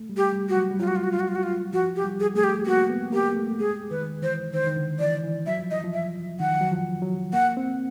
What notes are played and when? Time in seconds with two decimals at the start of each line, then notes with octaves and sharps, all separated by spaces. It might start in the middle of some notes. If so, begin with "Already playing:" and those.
Already playing: A3
0.10 G3
0.17 G4
0.32 G3
0.49 F#4
0.56 F#3
0.71 G3
0.80 F#3 F4
0.88 F#4
0.96 F4
1.03 F#4
1.12 F4
1.20 F#4
1.28 F4
1.35 F#4
1.43 F4
1.73 F3 F#4
1.96 G4
2.04 G3
2.20 G#4
2.35 A3 G#4
2.44 G4
2.66 A#3 F#4
2.90 B3
3.13 A#3 G4
3.37 A3
3.59 G#3 G#4
3.91 D#3 B4
4.22 E3 C5
4.54 D#3 C5
4.67 D#3
4.77 D3
5.00 E3 D5
5.24 E3
5.46 F#3 E5
5.59 F3
5.71 E3 D#5
5.84 F3
5.93 E5
6.40 D#3 F#5
6.61 F#3
6.72 F3
7.02 F#3
7.33 A#3 F#5
7.57 C4